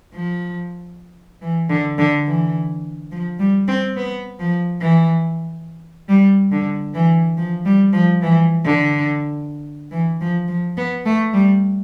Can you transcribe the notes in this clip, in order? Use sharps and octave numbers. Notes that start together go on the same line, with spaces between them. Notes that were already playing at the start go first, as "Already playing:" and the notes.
F3
E3
D3
D3
E3
F3
G3
C4
B3
F3
E3
G3
D3
E3
F3
G3
F3
E3
D3
E3
F3
F3
B3
A3
G3